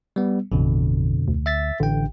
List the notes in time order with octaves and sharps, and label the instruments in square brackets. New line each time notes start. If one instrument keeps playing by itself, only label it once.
[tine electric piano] G3 B3
[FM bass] A1 [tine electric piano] F2 B2 D3
[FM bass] D2
[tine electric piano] E5 A6 B6
[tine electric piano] A1 G5 [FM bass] D3